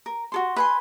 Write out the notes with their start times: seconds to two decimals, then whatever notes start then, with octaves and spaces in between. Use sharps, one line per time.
0.06 A#4
0.32 F#4 A4 C6
0.56 B4 G#5 C6